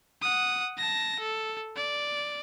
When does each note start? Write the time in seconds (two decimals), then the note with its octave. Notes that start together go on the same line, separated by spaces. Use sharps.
0.21 F#5 D#6
0.77 A5 A#6
1.19 A4
1.76 D5